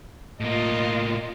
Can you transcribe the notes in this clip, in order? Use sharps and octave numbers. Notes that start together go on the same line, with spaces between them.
A2 A#3 F4 D#5